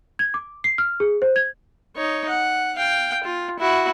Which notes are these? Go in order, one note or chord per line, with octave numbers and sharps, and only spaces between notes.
G#6
D6
C7
F6
G#4
C5
G#6
D#4 C#5
F#5
F5 G5
F4
E4 F#4